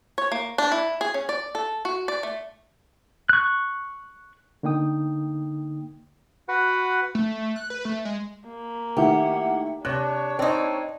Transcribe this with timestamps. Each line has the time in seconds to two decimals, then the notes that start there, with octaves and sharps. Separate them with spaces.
0.18 C#5
0.32 A#3
0.58 D4
0.72 E4
1.01 G#4
1.14 C#4
1.29 D5
1.55 A4
1.85 F#4
2.08 D5
2.23 A3
3.29 C#6 F#6
4.63 D3 A#3 D#4 G5 D#6
6.48 F#4 B4 F#5
7.15 A3
7.56 F#6
7.70 B4
7.85 A3
8.05 G#3
8.48 A#3
8.97 D#3 A3 E4 G4 F#5
9.85 C3 D4 C#5 F#6
10.39 C4 D#4 D5